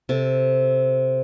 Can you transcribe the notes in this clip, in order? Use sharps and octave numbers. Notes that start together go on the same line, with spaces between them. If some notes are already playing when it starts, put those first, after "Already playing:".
C3 A4